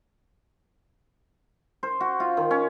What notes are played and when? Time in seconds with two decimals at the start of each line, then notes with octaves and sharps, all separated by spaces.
1.83 C5
2.01 F#4
2.20 F4
2.37 D#3
2.51 C#4